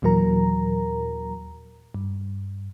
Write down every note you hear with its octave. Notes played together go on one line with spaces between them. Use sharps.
D#2 A#2 E3 F#3 A#4 A#5
G2